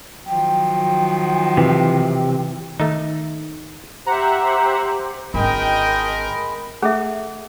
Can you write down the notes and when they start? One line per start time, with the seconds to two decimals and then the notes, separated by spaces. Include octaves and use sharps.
0.26 D#3 F3 F#3 G5
1.57 C3 E3
2.80 D#3 A3 D#4
4.06 G4 C5 E5 F#5 A#5
5.34 G#1 D3 G#3 A#4 D#5 G5 B5
6.82 A3 G#4 A4 E5